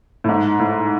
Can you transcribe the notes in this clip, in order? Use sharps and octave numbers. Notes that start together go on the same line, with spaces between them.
A2
G#2
A2